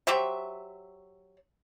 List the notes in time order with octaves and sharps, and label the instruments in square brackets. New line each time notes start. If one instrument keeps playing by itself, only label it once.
[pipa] F#3 G4 C5 E5